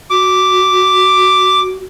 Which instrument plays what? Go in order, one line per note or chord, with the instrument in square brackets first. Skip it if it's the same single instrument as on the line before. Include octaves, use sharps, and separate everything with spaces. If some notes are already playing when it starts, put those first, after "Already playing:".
[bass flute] F#4 [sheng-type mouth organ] D6